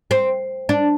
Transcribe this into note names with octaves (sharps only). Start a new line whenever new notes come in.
C4
D4